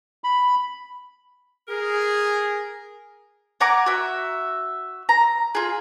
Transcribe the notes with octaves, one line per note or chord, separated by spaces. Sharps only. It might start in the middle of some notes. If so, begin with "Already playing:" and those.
B5
G#4 A#4
F#5 G#5 A#5 D6
F#4 E5
A#5
F4 G#4